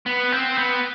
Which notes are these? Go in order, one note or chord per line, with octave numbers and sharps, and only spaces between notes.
B3
C4
B3